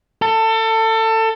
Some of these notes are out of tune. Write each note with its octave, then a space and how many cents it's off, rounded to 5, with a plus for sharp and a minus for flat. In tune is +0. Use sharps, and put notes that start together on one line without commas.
A4 +25